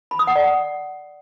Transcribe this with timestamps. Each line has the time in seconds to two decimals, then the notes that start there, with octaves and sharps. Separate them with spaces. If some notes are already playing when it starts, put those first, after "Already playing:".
0.11 B5
0.19 D#6
0.27 F#5
0.35 D5
0.44 F#5